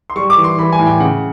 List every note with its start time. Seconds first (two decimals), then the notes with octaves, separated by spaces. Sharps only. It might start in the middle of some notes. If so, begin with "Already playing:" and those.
0.10 C6
0.16 G3 C#6
0.30 D6
0.37 E3
0.44 C6
0.58 E3 B5
0.72 G#5
0.79 A2
0.87 G5
1.00 C#3 F#5